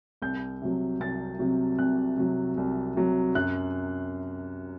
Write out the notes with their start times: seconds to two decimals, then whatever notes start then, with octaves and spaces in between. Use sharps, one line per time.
0.22 C2 G6
0.62 C3 F#3
1.00 C2 A6
1.39 C3 F#3
1.79 C2 F#6
2.17 C3 F#3
2.57 C2
2.96 C3 F#3
3.35 F#2 F#6